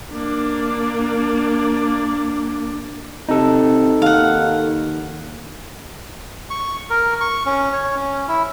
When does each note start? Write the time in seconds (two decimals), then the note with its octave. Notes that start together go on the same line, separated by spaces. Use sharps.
0.11 A#3 D4
3.29 C3 D#4 A4
4.02 D#2 F5 F#5
6.50 C#6
6.90 A#4
7.21 C#6
7.46 C#4
7.73 C#5
7.96 C#4
8.28 E4